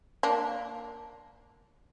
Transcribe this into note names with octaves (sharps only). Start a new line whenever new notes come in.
A#3 D4